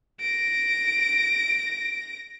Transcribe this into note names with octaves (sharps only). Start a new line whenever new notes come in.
A#6 D7